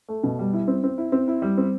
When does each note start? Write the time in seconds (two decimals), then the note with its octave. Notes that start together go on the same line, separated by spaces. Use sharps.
0.08 A3
0.24 B2
0.39 G3
0.53 E4
0.68 C4
0.84 C4
0.98 E4
1.12 C4
1.28 E4
1.42 G3
1.57 C4